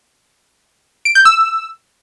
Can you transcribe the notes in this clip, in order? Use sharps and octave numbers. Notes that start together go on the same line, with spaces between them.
D7
G6
E6